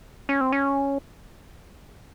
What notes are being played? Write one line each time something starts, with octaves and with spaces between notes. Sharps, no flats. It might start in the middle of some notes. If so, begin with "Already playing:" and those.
C#4
C4
C#4